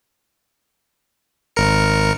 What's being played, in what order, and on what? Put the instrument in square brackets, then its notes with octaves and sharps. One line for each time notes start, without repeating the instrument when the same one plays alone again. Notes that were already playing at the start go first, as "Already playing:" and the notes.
[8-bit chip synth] G#1 A#4 C#7